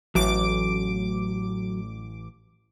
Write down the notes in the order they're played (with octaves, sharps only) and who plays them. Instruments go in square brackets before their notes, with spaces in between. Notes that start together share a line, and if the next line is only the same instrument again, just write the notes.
[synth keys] A1 D6 D7 [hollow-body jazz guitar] F#3